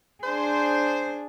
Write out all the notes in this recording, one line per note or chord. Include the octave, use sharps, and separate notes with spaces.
D4 G#4 C5